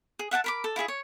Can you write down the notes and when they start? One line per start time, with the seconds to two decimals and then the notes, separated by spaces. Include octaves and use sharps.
0.19 G#4
0.31 E5 F#5 G5 A5
0.44 A#4 B5 D6
0.64 A4
0.76 E4 F4 G#4 E5
0.88 C#5